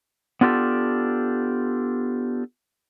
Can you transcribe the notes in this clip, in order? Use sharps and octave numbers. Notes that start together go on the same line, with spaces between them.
B3 D4 F4 G4 A4